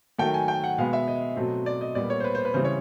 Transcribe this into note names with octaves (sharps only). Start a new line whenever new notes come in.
D#3 F#3 A3 G5
G#5
G5
F#5
B2 G#3 B3 F5
E5
D#5
B2 F#3 A3 C4
D5
D#5
A#2 G3 B3 D5
C#5
C5
B4
C5
B4
C#3 E3 G3 C4 C5
C#5